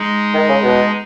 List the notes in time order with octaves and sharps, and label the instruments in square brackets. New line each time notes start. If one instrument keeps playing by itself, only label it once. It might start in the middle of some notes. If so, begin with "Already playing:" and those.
Already playing: [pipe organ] G#3 D#4 G#4
[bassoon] D#3
C#3
B2